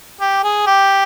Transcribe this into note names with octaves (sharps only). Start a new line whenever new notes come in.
G4
G#4
G4